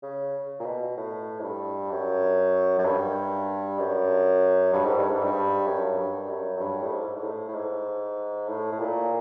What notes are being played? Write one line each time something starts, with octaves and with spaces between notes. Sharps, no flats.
C#3
A#2
B2
A2
G#2
G2
F#2
F#2
G2
F#2
G2
G#2
G2
G#2
G2
F#2
G2
F#2
F#2
G2
A2
G#2
G#2
A2
A2
G#2
A2
A2
A#2